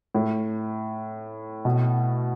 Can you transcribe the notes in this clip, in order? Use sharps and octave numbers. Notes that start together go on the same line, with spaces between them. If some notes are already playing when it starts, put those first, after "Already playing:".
A2
B2